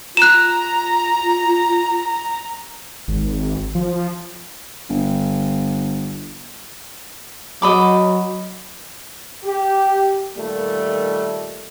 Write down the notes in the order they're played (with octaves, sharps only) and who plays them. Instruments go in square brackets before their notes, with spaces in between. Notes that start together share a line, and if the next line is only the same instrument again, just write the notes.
[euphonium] F4 [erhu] A#5 [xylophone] F#6 E7
[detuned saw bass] G#1
F3
[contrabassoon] G1
[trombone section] F#3 [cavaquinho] D#5 B5 D6
[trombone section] G4
A#2 D#3 G3 A3